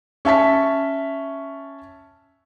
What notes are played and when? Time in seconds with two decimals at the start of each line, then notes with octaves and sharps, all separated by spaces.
0.25 C#4 E5 A5 B6